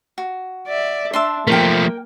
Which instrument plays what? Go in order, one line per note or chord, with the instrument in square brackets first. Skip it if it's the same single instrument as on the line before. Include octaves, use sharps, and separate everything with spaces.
[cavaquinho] F#4
[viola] D5 E5
[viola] D4 [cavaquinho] E5 A5 C6
[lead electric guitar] F3 A3 [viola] A#3 [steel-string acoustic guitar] A#4 G5